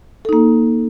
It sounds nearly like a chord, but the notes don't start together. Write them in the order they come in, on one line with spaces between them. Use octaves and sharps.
A4 D#4 A#3